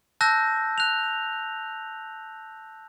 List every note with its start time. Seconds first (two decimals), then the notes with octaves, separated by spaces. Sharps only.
0.21 A5 E6 F#6 G6 A#6
0.78 F#6 F7